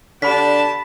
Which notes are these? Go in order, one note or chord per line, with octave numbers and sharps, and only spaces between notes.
D3 D4 G4 A5 B5 B6